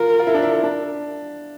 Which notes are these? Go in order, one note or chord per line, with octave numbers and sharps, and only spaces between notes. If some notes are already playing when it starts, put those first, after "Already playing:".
Already playing: F4 A#4
F4
E4
D4
E4
D4